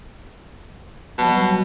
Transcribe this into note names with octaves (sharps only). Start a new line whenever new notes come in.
B2 F#3 G3 A5